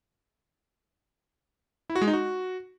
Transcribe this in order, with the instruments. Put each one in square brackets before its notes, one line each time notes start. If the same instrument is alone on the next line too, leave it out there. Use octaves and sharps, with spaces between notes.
[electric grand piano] E4
F#4
G#3
D#4
F#4